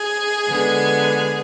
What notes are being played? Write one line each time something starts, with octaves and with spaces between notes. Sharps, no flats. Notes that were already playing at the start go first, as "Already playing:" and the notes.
Already playing: G#4
D3 G#3 B3